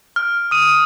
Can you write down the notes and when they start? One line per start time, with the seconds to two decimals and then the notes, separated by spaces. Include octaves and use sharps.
0.16 F6
0.51 D#6 D#7